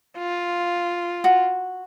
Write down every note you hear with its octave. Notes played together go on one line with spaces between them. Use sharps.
F4
F#4